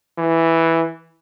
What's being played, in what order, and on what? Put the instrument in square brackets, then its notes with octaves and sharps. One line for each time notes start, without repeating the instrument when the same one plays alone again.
[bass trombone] E3